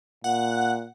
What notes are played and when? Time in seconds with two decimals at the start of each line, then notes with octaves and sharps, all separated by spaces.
0.24 A#2 F#5